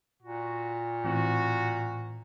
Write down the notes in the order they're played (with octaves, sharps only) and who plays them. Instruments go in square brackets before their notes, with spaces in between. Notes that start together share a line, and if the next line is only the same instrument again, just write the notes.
[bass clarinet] A#2 [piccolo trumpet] F#4
[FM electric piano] A2 E3 C4 [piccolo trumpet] F#4